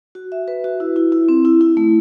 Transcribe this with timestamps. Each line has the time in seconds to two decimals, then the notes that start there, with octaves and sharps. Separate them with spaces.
0.15 F#4
0.32 E5
0.48 B4
0.64 F#4
0.80 E4
0.96 E4
1.12 E4
1.29 C4
1.45 E4
1.61 E4
1.77 A3